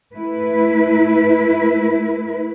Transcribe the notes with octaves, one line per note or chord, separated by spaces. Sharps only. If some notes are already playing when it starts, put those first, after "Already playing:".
A3 E4 B4